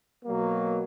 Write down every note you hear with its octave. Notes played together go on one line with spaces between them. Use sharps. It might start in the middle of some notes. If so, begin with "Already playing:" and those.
B2 F#3 A#3